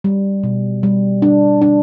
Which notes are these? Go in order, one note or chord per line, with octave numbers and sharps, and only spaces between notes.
G3
B2
G3
D4
D4